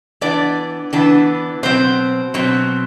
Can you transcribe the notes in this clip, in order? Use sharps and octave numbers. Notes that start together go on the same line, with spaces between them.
E3 B3 D4 D5
E3 B3 D4
B2 F#3 C4 C5
B2 F#3 C4